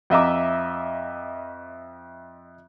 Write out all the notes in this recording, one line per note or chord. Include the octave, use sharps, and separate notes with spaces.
F2 D#5 E5 A#5 D6